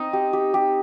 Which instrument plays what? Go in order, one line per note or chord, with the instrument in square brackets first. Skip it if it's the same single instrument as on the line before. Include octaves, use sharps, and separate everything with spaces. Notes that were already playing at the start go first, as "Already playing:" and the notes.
Already playing: [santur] C4 [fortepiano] D#4
[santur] G4
G4
G4